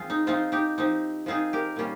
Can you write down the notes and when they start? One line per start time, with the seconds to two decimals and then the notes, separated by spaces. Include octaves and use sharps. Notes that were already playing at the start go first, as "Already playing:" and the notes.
Already playing: F3 C4 F4 G#4
0.10 D#4
0.27 F3 C4 D#4 F4
0.52 D#4 G4
0.78 F3 C4 D#4
1.26 F3 C4 D#4 F4 G#4
1.53 G4 A#4
1.76 A#2 G3 C#4 F4